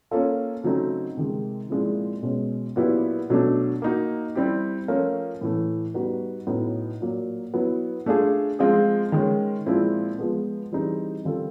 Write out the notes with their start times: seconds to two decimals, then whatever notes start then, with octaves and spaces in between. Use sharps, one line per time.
0.11 A#3 C#4 F4 A4
0.63 C#3 F#3 A3 C4 D#4
1.17 C3 D#3 G#3
1.70 A#2 F3 G#3 C4 E4
2.23 B2 G#3 C#4
2.76 A#2 F#3 B3 E4 G4
3.30 B2 F#3 A3 D4
3.82 A#3 D#4 F#4
4.35 G3 C4 E4 G4
4.88 F3 A3 C#4 F4 A#4
5.41 A2 E3 A3
5.94 G3 B3 D#4 F#4 B4
6.47 A2 F#3 B3 D#4
7.00 A#2 F#3 A#3
7.54 F#3 B3 E4
8.06 A3 D4 F4 G#4
8.59 F3 G#3 C4 F4 G#4
9.12 D#3 G#3 C#4
9.66 A#2 F3 G#3 C4 E4
10.19 F3 G#3 B3
10.72 E3 G3 C4 D#4 G#4
11.25 D#3 G3 C4 F4 A4